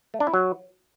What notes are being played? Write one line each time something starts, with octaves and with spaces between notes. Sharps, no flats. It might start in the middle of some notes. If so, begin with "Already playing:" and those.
A3
D4
E4
F#3